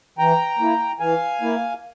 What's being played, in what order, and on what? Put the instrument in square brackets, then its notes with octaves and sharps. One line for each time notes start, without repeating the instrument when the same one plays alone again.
[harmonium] E3 G5 A#5
A#3 E4
E3 F5 G#5
A#3 E4